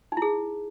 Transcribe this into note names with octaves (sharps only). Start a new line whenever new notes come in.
D#4 E4 G#4